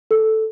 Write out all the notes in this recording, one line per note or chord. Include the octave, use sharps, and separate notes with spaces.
A4